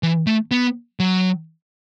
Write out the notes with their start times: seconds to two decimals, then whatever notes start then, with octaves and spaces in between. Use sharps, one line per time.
0.03 E3
0.27 A3
0.51 B3
1.00 F#3